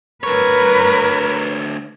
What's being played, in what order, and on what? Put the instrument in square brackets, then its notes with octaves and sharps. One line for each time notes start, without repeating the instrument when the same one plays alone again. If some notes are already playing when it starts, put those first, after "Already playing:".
[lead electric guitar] D2 C#5 [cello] A#4 B4